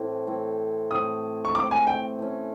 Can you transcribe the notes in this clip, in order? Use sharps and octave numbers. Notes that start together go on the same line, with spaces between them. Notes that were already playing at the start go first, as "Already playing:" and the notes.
Already playing: A2 E3 A3 C4
A2 E3 A3 C4
A2 E3 A3 C4 D#6
C#6
A2 E3 A3 C4 D6
G#5
G5
E3 A3 C#4